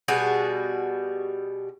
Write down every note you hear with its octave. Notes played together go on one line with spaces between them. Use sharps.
B2 G3 F#4 G#4